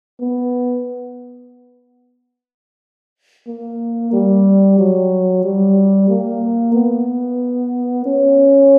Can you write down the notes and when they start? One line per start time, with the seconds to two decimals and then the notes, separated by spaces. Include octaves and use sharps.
0.21 B3
3.48 A#3
4.13 G3
4.79 F#3
5.44 G3
6.09 A#3
6.75 B3
8.06 C#4